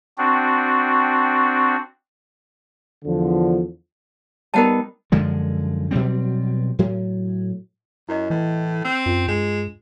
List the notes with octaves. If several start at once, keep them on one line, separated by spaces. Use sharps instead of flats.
C4 D4 F#4
E2 D3 F3
G3 B3 D#4 A#4 F#5 A5
F#2 D3 F3 G#3
B2 F#3 G3 C4
A2 F#3
F#2 E4 D#5
A2 E3
C4 E6
F#2 F4
G2 G#3